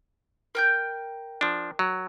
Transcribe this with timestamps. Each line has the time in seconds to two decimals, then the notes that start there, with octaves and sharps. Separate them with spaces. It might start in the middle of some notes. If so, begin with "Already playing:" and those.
0.55 A#4 G5 G6
1.41 F3 D4
1.79 F#3